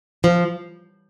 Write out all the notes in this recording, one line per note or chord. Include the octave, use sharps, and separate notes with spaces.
F3